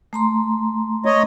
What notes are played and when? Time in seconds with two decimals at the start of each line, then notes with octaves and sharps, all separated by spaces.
0.13 A3 A#5 C6
1.05 C#5 D#5